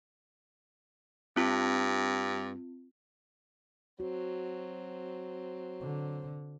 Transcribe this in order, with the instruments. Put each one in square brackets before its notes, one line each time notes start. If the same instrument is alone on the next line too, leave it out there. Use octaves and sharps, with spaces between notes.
[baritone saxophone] G2 [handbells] C4 F4
[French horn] F#3 [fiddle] C4 [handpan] F#4
[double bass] D3